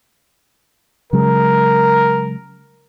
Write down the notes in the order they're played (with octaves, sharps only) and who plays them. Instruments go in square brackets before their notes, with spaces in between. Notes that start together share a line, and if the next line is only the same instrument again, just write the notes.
[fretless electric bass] C#3 F#3 G#3 [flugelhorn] A#4